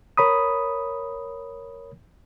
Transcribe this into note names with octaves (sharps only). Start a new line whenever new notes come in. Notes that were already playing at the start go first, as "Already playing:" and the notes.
A#4 C#5 B5 D#6